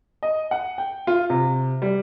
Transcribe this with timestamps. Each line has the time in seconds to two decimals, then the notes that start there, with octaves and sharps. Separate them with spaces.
0.23 D#5
0.51 F#5
0.78 G5
1.07 F4
1.30 C3
1.82 G3